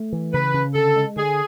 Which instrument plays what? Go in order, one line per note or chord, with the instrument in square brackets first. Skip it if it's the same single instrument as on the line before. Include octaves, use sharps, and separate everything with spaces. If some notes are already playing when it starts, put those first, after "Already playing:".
Already playing: [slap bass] A3
E3
[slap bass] C#3 [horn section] B4
[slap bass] C#3
[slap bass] D3 [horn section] A4
[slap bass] G#3
[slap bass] D3 [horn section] G#4